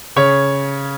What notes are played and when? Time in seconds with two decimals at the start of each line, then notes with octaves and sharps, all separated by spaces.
0.16 C#3 C#5